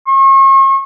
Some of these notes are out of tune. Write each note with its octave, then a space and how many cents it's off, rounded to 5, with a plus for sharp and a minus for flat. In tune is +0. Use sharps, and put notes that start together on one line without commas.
C#6 -40